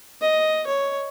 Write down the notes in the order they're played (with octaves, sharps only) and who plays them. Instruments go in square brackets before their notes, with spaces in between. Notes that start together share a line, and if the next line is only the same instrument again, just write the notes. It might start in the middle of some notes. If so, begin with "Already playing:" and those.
[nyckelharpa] D#5
C#5